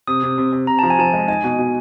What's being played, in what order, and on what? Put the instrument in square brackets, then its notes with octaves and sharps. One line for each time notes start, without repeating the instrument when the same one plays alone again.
[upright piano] C3 [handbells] D#6
[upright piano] C3
C3
C3
[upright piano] C3 [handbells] A#5
[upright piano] F3 [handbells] A5
[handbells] G#5
[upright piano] F3 [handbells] A5
[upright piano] G#3
[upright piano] D#4 [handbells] G#5
[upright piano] B2
B2